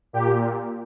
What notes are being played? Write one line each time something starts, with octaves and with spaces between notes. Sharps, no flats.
A#2 G4